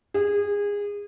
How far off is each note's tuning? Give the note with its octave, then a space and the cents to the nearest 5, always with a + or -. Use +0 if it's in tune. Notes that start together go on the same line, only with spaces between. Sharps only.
G#4 -25